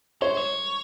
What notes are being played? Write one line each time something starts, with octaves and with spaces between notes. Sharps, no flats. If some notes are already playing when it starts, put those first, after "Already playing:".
C5 C#5
C#5